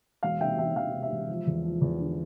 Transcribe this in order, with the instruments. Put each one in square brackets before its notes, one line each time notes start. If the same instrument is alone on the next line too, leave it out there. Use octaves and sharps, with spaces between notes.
[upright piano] E1 F5
C3 E5 G5
E1 E5 G5
E1 F5
C3
E5
E1
F3
E2
F3
E2
D3